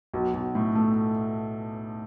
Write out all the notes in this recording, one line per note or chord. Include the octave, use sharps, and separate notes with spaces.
B1
B1
A2
A3